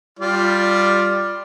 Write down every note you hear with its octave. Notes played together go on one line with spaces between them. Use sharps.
G3 F4 D5